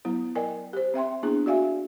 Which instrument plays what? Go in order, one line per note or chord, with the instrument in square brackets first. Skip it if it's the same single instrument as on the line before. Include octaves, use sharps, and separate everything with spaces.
[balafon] F#3 B3 E4
A#4 D5 D#5 G5 G#5
G4 C5
C4 E5 G5 C6
A#3 B3 D4 E4 G#4
F#4 D5 E5 F5 G#5